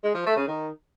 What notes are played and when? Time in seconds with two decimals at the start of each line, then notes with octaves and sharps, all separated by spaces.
0.03 G#3
0.14 F3
0.25 A3
0.37 C#3
0.48 D#3